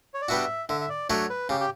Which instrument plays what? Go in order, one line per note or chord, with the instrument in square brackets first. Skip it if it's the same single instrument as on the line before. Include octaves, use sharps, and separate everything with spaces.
[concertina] C#5
D5
[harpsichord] G3 B3 D4 F#4 [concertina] E5
[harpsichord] D3 [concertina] E5
[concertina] E5
D5
[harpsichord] F#3 A3 D4 [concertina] C#5
[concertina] B4
[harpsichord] C#3 [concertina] G4
[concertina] G4